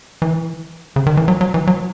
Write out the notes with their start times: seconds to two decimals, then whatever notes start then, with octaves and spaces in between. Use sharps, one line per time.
0.22 E3
0.96 C#3
1.06 D#3
1.17 E3
1.28 F#3
1.41 F#3
1.54 E3
1.67 F#3